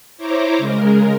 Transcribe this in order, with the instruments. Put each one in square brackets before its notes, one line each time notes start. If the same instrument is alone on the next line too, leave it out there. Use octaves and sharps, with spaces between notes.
[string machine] E4 C5 C#5 A#5 D6
C#3 G#3 A#4